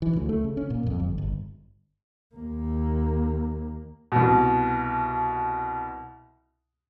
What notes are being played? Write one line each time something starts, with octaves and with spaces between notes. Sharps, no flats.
E3
D2
A3
C#3
C#4
A#2
F2
G1
G1
D#2 A#3
C2 B2